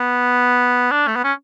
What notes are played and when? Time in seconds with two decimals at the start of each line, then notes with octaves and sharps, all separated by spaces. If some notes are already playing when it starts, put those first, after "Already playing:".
Already playing: B3
0.91 D4
1.07 A3
1.16 B3
1.24 C#4